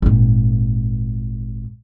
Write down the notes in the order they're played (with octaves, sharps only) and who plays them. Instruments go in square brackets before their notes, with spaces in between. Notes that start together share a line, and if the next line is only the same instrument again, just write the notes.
[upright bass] G#1 A#2